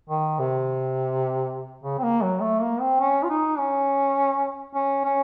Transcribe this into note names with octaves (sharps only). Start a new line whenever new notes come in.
D#3
C3
C#3
C4
A#3
F#3
A3
A#3
C4
C#4
F4
D#4
C#4
C#4
C#4